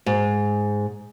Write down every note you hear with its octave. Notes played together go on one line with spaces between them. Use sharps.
G#2